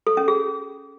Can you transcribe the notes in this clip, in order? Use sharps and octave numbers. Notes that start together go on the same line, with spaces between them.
A4
C#4
G#4